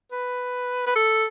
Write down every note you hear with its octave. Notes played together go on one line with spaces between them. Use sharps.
B4
B4
A4